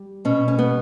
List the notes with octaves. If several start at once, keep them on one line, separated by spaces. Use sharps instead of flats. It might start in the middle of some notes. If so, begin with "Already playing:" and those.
Already playing: G3
B2 C#4
C#4
G3 B3